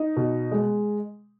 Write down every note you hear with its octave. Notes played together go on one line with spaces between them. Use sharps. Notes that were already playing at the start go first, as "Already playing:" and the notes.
Already playing: D#4
B2
G#3